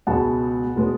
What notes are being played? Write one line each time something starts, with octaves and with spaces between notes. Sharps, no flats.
C#2 B2 G#3 F#5 A5
B2 G#3 B3